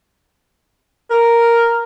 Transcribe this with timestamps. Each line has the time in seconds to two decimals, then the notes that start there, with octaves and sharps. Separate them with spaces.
1.11 A#4